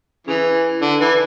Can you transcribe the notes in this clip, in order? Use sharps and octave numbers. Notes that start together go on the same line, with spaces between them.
C#3 E3
D3
E3